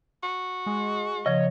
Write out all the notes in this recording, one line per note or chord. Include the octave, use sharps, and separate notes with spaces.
F#4
G#3
C#3 F3 C#5 D#5